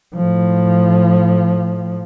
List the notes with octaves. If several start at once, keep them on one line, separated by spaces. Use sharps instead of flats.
A2 F3